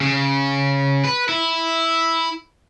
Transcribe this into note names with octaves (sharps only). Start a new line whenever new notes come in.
C#3
B4
E4